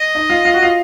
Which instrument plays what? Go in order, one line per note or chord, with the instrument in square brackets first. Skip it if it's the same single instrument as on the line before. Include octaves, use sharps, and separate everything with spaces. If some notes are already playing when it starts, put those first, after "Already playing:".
Already playing: [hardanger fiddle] D#5
[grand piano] D#4
F4
F4
F#4
F4